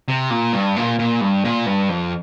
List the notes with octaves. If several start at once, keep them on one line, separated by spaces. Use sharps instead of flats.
C3
A#2
G2
A#2
A#2
G2
A#2
G2
F2